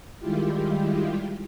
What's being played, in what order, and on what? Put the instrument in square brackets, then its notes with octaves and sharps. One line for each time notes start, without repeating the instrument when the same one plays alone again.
[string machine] D#3 G3 G#3 E4 F4 G4